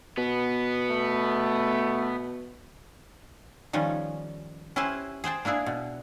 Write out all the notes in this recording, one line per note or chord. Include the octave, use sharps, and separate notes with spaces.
B2 B3
A3
D#3 F3 G3 C#4
C#4 E4 G4 B4 C5
G#4 C5 G5 A5
A#3 D4 E4 G#4
B2